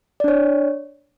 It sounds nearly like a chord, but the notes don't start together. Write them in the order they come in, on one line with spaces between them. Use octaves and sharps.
D5 D4 C#5